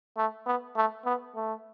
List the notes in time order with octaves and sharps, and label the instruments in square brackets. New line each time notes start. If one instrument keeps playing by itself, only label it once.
[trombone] A3
B3
A3
B3
A3